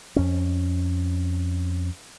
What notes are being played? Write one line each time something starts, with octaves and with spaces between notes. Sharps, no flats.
F2 C#4